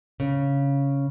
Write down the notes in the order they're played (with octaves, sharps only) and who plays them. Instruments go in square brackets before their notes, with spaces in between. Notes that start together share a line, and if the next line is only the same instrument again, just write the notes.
[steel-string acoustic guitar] C#3